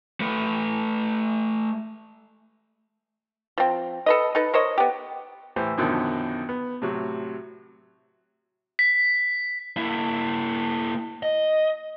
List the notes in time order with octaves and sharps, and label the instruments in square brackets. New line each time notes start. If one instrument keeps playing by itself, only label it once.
[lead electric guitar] A3 B4
[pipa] F3 C4
A4 B4 D#5
D#4 A4 B4
A#4 C5 C#5 D#5
B3 G4
[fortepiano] A2 E3 G4 C5
F#2 B2 D3 D#3 F3 F#3
B3
A2 C3 F#3
[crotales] B6
[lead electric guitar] A#3 E4
D#5